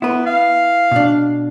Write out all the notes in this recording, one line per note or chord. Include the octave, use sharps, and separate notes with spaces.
B3 E4 B4
F5
B2 D4